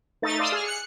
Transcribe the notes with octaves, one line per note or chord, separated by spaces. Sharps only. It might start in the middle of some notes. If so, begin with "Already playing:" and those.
A3 D#4 A6
D5 F5 C6 D#6 E6
G#4 F6
F#6 C#7